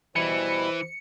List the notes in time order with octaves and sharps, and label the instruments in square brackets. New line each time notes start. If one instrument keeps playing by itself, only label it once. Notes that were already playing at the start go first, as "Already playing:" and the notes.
[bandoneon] B2 G3 E4 [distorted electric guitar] E3 [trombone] C5 [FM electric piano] C#7